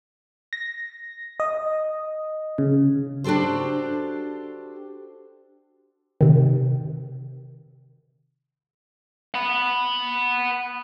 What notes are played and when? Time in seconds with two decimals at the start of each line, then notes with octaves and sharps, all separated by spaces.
0.53 A#6
1.40 D#5
2.58 C#3
3.24 D4 F#4 G4 A4 C5
6.21 C3 D#3
9.34 F#5 B5